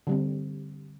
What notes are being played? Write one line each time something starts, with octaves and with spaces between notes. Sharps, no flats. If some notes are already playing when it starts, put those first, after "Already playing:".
D3 G3 C4